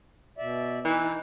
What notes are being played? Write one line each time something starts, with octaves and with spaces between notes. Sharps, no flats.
B2 D5 E5
E3 D#4